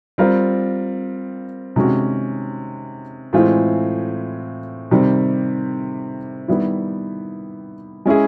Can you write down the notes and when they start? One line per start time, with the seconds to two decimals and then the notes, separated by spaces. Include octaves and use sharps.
0.18 G3 C4 F4 A#4
1.76 C3 D#3 G#3 C#4 F#4
3.33 A2 E3 G#3 C4 F4
4.91 C3 D#3 G3 C4
6.48 D#3 G3 B3 E4
8.06 G#3 C#4 E4 G#4